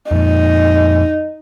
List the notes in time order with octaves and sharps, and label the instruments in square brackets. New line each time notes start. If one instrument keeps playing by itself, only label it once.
[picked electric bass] F2 A#2 [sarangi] D#4